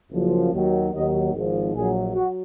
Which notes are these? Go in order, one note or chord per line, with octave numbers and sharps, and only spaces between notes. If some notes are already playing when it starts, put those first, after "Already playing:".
F#1 F#2 F3
D#2 D#3 F#3
D#2 D#3 F#3 D#5
G#1 G#2 F3
A#1 A#2 F#3 G#4
F#3 F#4